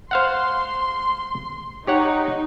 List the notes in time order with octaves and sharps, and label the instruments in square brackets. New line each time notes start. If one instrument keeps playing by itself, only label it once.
[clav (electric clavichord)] C5 F5 F#5 [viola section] C6
[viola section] D#4 [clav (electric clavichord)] G4 C#5 F#5